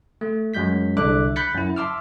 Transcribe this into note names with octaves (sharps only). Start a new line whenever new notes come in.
A3
F#2 F#3 G#3 G6 B6
C2 D3 D4 E5 D6 F#6
B5 F#6 G6 A6 B6 C#7
F#2 E4
E5 A5 C6 D6 E6 F6